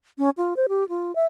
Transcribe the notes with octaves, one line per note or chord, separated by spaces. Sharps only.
C#4
F4
C5
G4
F4
E5